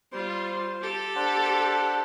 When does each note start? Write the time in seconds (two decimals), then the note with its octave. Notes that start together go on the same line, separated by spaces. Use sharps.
0.12 G3 F4 C5 C6
0.81 G4 A4
1.16 D4 C5 F#5